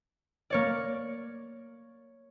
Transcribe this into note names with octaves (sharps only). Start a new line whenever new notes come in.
A#3 C#5 D5